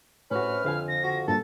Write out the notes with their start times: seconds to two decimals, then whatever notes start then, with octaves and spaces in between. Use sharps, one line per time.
0.31 A2 C3 C#4 F#4 B4 F6
0.64 F2 D3 F5 G#5
0.88 A#6
1.04 F#4
1.28 G2 A#2 A4 A6